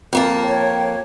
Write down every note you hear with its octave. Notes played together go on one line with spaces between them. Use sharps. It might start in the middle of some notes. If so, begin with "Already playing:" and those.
F2 A#3 A5
C#5 G5